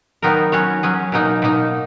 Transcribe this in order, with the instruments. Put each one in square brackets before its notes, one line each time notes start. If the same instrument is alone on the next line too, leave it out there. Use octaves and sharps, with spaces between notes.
[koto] D#3 F#3 B3 D#4 A#4
F#3 C#4 F#4 C#5
F#3 C#4 G#4
B2 F#3 A#3 D#4
B2 A#3 D#4